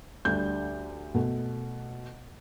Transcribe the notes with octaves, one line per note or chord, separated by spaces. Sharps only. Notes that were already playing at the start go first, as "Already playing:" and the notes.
D2 D3 G3 G6
B2 A3